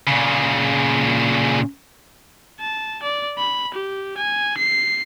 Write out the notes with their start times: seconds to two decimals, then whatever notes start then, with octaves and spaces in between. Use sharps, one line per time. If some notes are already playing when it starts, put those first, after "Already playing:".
0.07 A#2 C#3
2.60 A5
3.03 D5
3.38 B5
3.74 G4
4.17 G#5
4.58 C7